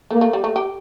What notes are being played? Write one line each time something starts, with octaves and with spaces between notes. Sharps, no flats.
A3 A#3
A3
G3
A3
G4